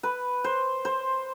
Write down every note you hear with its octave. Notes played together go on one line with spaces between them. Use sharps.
B4
C5
C5